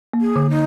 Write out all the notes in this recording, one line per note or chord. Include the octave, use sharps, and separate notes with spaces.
A#3
G#4
D3
D#4